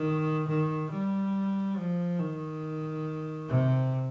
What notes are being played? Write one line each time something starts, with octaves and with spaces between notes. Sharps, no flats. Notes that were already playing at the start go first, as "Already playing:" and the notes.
Already playing: D#3
D#3
G3
F3
D#3
C3